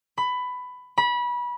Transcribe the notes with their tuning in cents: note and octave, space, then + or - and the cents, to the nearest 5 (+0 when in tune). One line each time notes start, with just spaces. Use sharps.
B5 +15
B5 -25